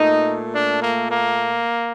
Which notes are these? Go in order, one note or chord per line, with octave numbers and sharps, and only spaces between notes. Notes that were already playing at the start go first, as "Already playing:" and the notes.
Already playing: A#2 A3 D#4
D4
A#3
A#3